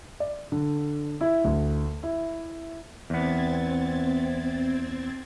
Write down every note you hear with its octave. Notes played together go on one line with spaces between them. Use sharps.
D5
D3
E4
D2
E4
E2 B3 C4 G#6 A6